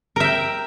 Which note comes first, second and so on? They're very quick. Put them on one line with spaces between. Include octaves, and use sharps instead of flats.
A#4 E5 G5